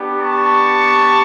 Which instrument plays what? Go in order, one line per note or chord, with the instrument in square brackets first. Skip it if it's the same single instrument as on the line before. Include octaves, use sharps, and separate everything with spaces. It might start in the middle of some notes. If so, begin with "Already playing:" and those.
Already playing: [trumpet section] B3 D4 G4
A5 C#6